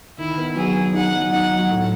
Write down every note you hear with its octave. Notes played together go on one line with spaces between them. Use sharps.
D#3 E4
B3
F#3 G#4
F#3
D#4 F#5
F#3
D#4 F#5
F#3
A2